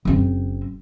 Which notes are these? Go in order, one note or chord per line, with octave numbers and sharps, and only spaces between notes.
F#1 C4